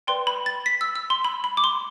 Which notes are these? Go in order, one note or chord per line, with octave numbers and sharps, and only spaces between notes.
B4 D5 G5 C6
B5
A6
B6
E6
E6
C6
B5
B5
D6
C6